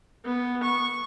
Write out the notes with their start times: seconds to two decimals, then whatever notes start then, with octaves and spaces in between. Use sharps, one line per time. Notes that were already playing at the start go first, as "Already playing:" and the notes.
0.25 B3
0.63 C#6